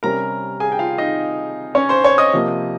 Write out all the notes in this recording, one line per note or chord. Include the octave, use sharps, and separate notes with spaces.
C3 G3 C#4 A#4 A#5
G#4 G#5
G5
F4 F5
D#4 D#5
C#4 C#5
C5 C6
C#5 C#6
D#5 D#6
C3 F3 A#3